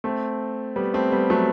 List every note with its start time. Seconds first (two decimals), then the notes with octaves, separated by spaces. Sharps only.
0.04 A3 C4
0.76 G3 B3
0.94 A3 C4
1.12 G3 B3
1.30 F#3 A3